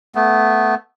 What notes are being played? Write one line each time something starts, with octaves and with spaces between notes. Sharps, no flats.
A3 B3